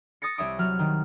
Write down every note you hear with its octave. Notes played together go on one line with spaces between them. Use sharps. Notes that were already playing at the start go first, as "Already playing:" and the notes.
D#6 A6 A#6 C#7
C2 C#5 E5 D#6 D7
F#3 F6
D#3